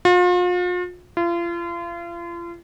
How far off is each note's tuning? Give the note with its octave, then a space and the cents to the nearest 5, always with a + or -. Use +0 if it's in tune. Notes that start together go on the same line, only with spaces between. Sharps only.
F4 +40
F4 -35